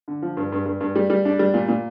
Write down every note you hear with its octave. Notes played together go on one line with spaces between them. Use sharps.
D3
F3
G2
G2
G2
G2
G3
G3
D4
G3
A#2
A#2